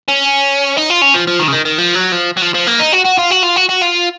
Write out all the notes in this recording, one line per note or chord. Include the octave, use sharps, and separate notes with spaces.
C#4
D#4
F4
C#4
F3
F3
D#3
C#3
D#3
D#3
F3
F#3
F3
F#3
F3
F3
A#3
D#4
F#4
F#4
F4
F#4
F4
F#4
F#4
F4